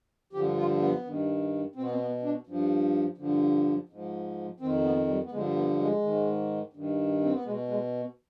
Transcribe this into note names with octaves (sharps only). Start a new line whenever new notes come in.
G2 D3 F3 G4
F4
B3
G2 D#3
B2 C4
B3
C4
B3
D4
G2 F3
G2 D3 F3
G#2 F3
F2 D#3 C4
B3
G3
B3
G2 D3 F3 G#3
B3
G#3
G#2 D#3
G2 D#3
C4
B3
B2 G#3
G#3